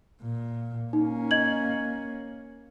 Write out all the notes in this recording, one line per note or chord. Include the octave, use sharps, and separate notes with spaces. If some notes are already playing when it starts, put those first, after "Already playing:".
A#2
A#3 C#4 D#4
D#5 G#6 F#7